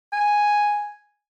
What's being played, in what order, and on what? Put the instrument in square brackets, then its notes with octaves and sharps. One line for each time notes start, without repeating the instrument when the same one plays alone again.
[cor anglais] G#5